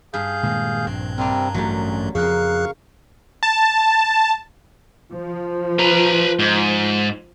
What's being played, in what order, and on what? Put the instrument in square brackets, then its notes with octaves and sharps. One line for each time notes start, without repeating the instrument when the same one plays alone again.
[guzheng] G2 [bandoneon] G#4 F5 G6
[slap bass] A#2 D#3 G#3
[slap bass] A#1 [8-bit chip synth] G2 [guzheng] C4
[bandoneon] C3 G3 C4 [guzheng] D4 F4 A#4
[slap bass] A1 A3 [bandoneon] F#2 [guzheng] F#3 G3
[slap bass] F2 F3 [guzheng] C#3 A#3 [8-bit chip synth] G#4 F#6 [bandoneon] F5 C#6
[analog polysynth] A5
[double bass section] F3
[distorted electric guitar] B4 A#5
G#2